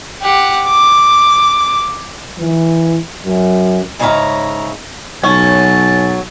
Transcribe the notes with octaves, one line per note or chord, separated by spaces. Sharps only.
G4 F#5
D6
E3
F#2
G#2 C#3 C#5 E5 F5 A#5
B1 F#3 C#4 A5